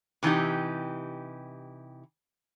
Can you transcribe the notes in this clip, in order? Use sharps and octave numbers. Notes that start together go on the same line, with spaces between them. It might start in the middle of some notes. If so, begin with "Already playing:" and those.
C3 E3 C4 D#4 G4